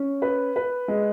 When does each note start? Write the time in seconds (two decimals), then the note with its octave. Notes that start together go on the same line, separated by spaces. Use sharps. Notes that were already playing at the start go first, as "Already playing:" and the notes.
Already playing: C#4
0.22 B4
0.56 B4
0.88 G#3